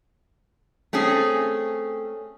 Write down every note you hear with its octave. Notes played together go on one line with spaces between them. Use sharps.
A3 C4 C#4 G#4